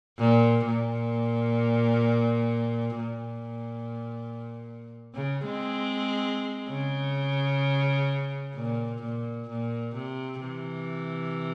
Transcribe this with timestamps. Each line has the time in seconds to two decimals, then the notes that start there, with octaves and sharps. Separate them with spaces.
0.19 A#2
0.66 A#2
2.98 A#2
5.15 C#3
5.45 G#3 C4
6.70 C#3
8.55 A#2
9.02 A#2
9.49 A#2
9.95 C3
10.41 C3 E3